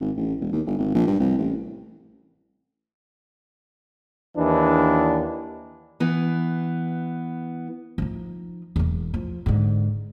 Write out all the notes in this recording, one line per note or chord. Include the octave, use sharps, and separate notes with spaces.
G#1
A1
E1
D#2
G1
G#1
A#1
G2
C2
A1
D#2 E3 D4
E3 B3
F3 D#4
E1 E2
F3
G#2 D3